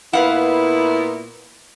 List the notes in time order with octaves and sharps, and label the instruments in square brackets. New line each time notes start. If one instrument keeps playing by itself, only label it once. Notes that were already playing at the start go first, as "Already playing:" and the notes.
[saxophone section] A#2 B3 E4 [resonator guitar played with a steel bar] B4 F5 F#5